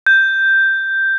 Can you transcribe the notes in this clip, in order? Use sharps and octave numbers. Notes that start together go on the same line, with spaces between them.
G6